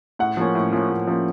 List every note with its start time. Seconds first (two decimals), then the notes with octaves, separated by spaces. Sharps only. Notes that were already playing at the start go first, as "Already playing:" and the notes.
0.19 A2 F#5
0.37 F3 A#3 C#4
0.55 A2
0.72 F3 A#3 C#4
0.89 A2
1.07 F3 A#3 C#4